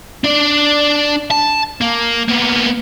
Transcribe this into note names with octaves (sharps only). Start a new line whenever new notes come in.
D4 D5
A5
A#3
A#3 B3